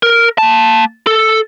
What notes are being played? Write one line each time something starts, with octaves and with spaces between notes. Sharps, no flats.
A#4
A#3 A5
A4